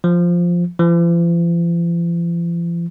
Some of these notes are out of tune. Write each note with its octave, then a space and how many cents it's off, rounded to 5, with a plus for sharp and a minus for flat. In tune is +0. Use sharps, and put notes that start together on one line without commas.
F3 +0
F3 -45